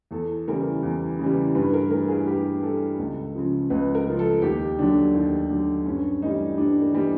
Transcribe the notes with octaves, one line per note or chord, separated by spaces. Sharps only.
E2 A4
C#3 E3 G3 A#4
E2
C#3 E3 G3
G2 B4
A#4
E3 G3 A#4
G#4
G2 G4
E3 G3 A4
C#2
C#3 F3
C#2 B4
A#4
C#3 F3
A4
D#2 G4
D3 F#3 D4
D#2
D3 F#3
G2 C#4
E3 G3 D#4
G2 D4
A#3
E3 G3